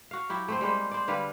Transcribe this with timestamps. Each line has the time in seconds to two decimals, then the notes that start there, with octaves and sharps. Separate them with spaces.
0.11 F#4 F5
0.29 F#3 E4 G4
0.48 A3 C4 C5
0.61 G3 G#3 A#3 C5
0.91 C5 D5
1.08 D3 G3 B4 F5